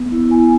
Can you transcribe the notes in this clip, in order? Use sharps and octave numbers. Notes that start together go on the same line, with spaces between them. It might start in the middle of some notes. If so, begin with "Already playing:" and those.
Already playing: B3
E4
B3 G#5